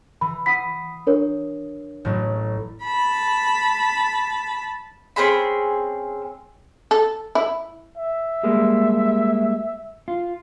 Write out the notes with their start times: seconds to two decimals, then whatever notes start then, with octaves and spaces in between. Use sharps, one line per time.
0.21 E3 B5
0.46 F#5 B5 D#6 B6 C7
1.07 D4 A#4 C#5
2.05 A1 A2 F#3
2.85 A5 B5
5.16 C4 C#4 G#4 B5
6.91 A4
7.35 E4
7.97 E5
8.43 G3 G#3 A#3
10.08 F4